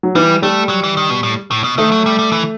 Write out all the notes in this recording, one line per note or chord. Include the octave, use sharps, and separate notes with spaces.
F#3
E3 G3
G3 A3
F#3
E3
D#3
B2
A2
A2
B2
D#3 A3
F#3
G3
G3
E3